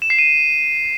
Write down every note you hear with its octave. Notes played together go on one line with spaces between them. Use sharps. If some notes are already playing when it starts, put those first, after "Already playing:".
E7
C7
D#7